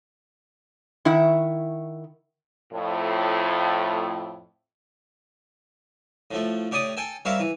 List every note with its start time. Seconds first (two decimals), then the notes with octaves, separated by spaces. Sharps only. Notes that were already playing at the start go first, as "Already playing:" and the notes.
1.05 D#3 E4 E5 F#5
2.73 F2 A2
6.31 A2 F3 A3
6.71 A2 G4 C#5 D5 D#6
6.97 A4 G5 G#5
7.25 G3 C4 A#4 C#5 E5 F5
7.40 E3